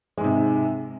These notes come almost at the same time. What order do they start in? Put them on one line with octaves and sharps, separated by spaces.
G#3 G#2 C3